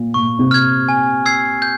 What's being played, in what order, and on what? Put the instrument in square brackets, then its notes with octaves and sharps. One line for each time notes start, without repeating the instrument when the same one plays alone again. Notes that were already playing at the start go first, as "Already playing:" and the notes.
Already playing: [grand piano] A#2
[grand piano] A#2 [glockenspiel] C#6
[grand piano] C3
[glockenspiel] F6 G#6
G#5
E6 G#6 C7
G6